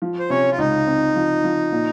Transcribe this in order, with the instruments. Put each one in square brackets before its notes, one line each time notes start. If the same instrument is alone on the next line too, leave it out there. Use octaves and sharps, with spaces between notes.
[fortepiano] F3
[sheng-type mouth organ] C5
[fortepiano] C3 [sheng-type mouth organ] C#4 C#5
[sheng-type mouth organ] F4
[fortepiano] C#2 [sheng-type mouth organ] D#4
[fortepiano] C4
F3
F3
A#2